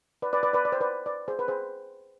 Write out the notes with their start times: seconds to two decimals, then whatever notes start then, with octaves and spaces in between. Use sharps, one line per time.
0.22 B4 D5
0.33 B4 D5
0.43 B4 D5
0.53 B4 D5
0.65 D5
0.72 C5
0.81 B4 D5
1.06 B4 D5
1.28 G#4 C5
1.39 B4
1.48 G#4 C5